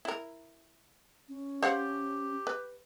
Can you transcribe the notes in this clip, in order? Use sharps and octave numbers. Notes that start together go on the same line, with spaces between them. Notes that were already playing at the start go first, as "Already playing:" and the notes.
E4 A#4
C#4
G4 C5 F5 F#5
B4